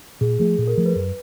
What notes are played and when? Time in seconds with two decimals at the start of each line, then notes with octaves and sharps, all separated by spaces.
0.21 A#2 G#4
0.39 F3 A3 G#4
0.58 A#2 A4
0.68 A#4
0.78 F3 A3
0.86 B4
0.95 F#2